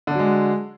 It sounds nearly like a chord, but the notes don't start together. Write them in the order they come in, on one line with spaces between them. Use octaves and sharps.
D3 D4 F#3 G#3